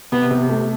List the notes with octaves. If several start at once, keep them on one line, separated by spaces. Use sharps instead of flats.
C3 B3
C3
A3